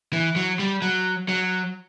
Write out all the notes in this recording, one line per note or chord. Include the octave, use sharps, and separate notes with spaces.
E3
F#3
G3
F#3
F#3